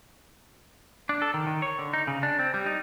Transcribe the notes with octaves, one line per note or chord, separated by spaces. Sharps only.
D4
A4
D#3
D#3
C#5
D3
D#4
C#3
D4
C4
G3
D#4